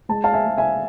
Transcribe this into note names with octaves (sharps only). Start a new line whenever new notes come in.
G#3 A5
F5 A5
E5 G#5
G#3
E5 G#5